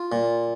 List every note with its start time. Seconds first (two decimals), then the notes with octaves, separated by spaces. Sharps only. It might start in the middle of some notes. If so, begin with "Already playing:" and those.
Already playing: F4
0.12 A#2